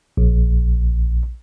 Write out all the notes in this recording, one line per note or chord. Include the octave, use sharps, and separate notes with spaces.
A#1